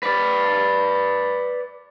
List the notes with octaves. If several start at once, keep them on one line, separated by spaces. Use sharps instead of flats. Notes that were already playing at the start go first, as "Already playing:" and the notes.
B4 D5